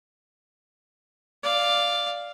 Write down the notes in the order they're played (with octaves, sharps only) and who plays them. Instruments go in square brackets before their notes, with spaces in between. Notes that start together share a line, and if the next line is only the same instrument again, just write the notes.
[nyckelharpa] D5 F5